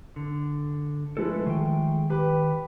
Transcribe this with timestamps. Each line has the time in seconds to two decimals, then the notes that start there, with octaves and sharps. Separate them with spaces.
0.16 D3
1.17 F3 G#3 A3 A4 B4
1.46 D#3 G5
2.10 G4 B4